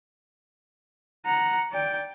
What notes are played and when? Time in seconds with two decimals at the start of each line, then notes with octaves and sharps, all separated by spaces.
1.26 F#5 A#5
1.72 D5 G5